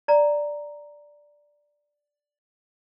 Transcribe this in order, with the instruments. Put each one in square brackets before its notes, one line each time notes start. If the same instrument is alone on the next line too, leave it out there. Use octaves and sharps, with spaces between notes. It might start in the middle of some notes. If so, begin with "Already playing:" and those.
[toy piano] D5 A#5